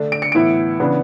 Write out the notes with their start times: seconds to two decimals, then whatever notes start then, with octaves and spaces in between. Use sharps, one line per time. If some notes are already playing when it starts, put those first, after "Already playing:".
Already playing: D3 A3 D4
0.12 D7
0.22 C#7
0.32 A2 E3 B3 E4 D7
0.80 C#3 E3 B3 D4